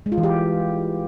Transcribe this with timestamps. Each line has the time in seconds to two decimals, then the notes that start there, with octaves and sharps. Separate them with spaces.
0.06 G#3
0.12 F4
0.18 E3
0.23 G4